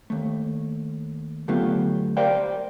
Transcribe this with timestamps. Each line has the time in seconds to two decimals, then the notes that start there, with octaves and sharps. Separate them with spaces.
0.10 D#2 A3
1.48 D3 F#3 A3 B3 F4 G4
2.17 G4 A#4 C5 D5 F5 G5